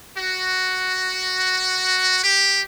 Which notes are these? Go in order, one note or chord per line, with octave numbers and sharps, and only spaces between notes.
F#4
G4